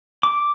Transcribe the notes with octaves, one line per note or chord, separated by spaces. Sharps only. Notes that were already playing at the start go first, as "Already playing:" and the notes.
D6